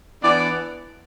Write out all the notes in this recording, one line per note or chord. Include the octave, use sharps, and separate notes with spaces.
E3 B3 D4 D5